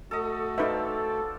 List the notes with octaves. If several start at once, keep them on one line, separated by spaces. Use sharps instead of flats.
A3 F#4 A4 D#5
D#4 A4 B4 C5 D5 E5 F5